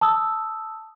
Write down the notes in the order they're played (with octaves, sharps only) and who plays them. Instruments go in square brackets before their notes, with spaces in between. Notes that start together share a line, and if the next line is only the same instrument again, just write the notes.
[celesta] A5 D#6 E6